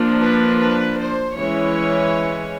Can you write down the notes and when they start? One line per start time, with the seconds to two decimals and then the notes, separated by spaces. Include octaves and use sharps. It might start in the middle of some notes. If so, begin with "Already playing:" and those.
Already playing: F3 A#3 D4
0.21 B4
0.60 B4
0.98 C5
1.36 E3 G#3 C#4 C#5